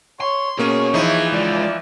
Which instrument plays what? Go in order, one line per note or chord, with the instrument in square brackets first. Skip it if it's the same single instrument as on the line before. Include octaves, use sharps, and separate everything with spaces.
[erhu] C#5 [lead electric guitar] C6
[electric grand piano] B2 A#3 C#4 [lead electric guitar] G#4 [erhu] C#5
[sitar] E3 F3 [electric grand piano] D#4 E4 [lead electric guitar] G#4
[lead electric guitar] G#3 F4 [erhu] D5